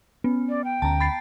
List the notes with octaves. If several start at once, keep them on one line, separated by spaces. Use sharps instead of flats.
B3 C#4
D5
G5
D2 C#4 A5 A#5
B5 A6 C7